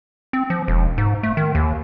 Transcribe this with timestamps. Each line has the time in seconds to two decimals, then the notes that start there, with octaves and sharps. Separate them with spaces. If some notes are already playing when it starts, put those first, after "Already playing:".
0.33 C4
0.50 F3
0.68 E1
0.98 G#2
1.23 A3
1.37 D#3
1.55 D#2